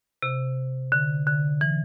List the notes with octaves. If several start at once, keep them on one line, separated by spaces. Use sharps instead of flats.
C3
D3
D3
E3